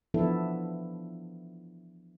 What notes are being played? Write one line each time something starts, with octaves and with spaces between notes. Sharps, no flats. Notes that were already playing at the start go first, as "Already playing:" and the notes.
E3 F3 B3 D4 E4 A4